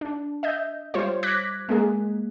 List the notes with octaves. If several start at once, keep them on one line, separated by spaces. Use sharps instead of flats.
D4
D#5 E5 G6
G3 F4 C5 C#5
D6 F#6 G#6 A#6 B6
G#3 A#3 G#4